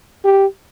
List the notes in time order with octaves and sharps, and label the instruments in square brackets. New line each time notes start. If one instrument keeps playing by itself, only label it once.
[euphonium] G4